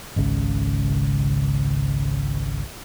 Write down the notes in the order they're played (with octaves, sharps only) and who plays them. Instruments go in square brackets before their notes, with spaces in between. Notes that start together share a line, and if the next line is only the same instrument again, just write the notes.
[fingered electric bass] G#1 C#2 C#3